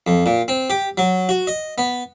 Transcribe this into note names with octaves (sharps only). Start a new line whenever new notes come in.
F2
A#2
C4
G4
F#3
F#4
D#5
B3